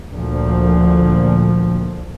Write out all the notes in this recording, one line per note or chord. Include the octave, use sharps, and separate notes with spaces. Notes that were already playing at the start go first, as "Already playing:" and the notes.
D2 A#2 F3